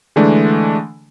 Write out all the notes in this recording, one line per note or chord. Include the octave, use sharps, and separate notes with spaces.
D3 E3 G#3 A3 D4